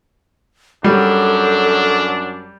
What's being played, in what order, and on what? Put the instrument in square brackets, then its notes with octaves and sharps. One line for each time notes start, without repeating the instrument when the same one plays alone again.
[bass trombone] F#2 [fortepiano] G3 [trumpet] D4 [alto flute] A4